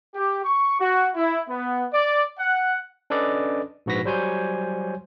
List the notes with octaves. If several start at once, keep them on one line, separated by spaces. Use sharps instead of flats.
G4
C#6
F#4
E4
B3
D5
F#5
C#4 D4 A4 B4 D5 D#5
A#1 G#2 F#4 B4 A#6 B6
F#3 G3 C5 C#5 G#5 G6